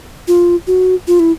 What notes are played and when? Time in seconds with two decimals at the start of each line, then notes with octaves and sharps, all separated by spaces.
0.28 F4
0.67 F#4
1.07 F4
1.20 E4